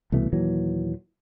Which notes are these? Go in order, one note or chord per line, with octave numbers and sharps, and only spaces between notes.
C2 B2 E3 A3
D#2 A#2 E3 F#3